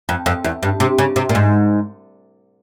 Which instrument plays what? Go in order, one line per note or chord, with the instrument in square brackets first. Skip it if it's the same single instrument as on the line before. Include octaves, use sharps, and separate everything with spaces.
[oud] F2
F2
E2
G2
C3
C#3
C3
A#2
G#2